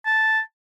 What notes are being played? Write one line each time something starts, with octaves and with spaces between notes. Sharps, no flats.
A5